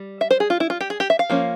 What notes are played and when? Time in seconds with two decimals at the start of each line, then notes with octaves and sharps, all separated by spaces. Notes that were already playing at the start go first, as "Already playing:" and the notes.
Already playing: G3
0.21 E5
0.31 C5
0.40 G#4
0.50 F4
0.60 E4
0.70 F4
0.81 G4
0.90 G#4
1.00 G4
1.10 E5
1.19 F5
1.30 F3 A#3 C#4